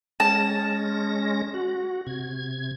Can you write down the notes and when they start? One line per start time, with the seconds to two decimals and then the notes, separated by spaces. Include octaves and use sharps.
0.20 G#3 C#4 A5 A#6
1.54 F#4
2.07 C3 G#6